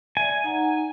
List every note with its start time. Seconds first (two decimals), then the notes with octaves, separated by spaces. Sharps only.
0.17 D5 E5 G#5
0.44 D#4 F#5 A#5